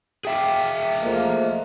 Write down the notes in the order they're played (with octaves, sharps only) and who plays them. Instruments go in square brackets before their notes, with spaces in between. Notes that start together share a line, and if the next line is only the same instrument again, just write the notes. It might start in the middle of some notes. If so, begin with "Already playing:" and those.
[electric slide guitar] G#4 E5 F5 [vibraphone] G5 D6
[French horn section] F3 A3 A#3 [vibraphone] D#5